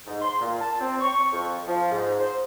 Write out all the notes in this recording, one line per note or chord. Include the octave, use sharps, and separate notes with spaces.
G#2
C6
A#2
A5
C4
C#6
F2
F3
G#2
C5